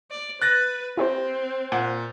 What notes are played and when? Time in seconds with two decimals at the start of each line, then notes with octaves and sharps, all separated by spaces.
0.11 D5
0.42 B4 F#6 A6 A#6
0.97 C4 E4 G4 C5
1.72 A#2 F#5